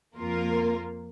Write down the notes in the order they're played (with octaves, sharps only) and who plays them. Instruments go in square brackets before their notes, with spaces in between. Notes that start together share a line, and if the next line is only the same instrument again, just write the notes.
[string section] F2 A#3 F4 A#4